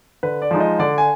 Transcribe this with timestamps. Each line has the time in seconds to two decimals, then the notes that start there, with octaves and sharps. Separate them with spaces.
0.23 D3 B4
0.42 D5
0.51 F3 G#3 D#4
0.60 D#5
0.79 D3 D5
0.98 G#5